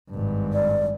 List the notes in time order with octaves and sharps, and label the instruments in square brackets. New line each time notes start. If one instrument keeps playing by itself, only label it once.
[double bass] G#1 G2
[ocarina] D5